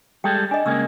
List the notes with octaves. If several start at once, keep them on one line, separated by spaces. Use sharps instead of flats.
G3 G#3 A4 G5
D4 D#5 G#5
C#3 G#3 A#3 A#5 E6